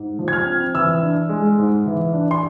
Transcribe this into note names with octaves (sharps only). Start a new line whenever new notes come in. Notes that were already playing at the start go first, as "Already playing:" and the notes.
Already playing: G#2
F3
G#6
F6
C4
E3 E6
D4
G#3
G#2
E3
D4
C6